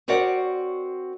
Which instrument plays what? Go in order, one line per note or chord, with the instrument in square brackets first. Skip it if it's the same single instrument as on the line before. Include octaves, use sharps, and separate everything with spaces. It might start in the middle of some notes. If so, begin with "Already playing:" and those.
[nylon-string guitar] C4 F#4 A#4 C#5 D5 F#5